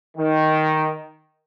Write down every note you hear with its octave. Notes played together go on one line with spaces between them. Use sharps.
D#3